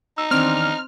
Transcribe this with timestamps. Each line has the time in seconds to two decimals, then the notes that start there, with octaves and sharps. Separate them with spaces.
0.18 D#4 E6
0.31 E2 D#3 C4 D4 F6